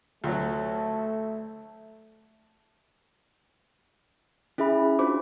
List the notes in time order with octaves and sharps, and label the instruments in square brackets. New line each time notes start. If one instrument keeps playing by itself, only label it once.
[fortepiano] D2 F#3 [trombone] A3
[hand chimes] C#4 E4 G#4 E5 B5
D4 F4 F#4 C5 D6